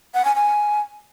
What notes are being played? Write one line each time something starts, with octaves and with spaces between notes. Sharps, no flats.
F#5
G#5
G#5